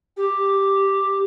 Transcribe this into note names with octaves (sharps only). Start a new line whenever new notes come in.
G4